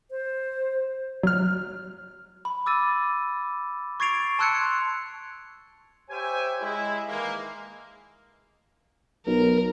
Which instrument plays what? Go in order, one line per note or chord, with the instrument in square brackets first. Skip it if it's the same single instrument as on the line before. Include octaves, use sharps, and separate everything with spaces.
[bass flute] C5
[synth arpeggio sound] F#3 F6
[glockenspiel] B5
D6 E6 A6 D#7
C#6 G#6 A6 C7 D7 F7
A5 C6 E6 F#6 G#6 C#7
[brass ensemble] G4 C5 C#5 E5 G5 G#5
G#3 E4
D#3 E3 G#3 A#3
[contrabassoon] B1 [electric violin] A#4